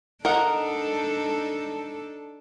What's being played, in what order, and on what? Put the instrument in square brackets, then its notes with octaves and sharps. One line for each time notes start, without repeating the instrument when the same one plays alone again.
[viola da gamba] D4 D#4 A4 [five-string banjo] A#4 D#5 F#5